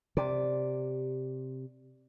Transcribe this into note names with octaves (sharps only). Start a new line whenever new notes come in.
C3 D5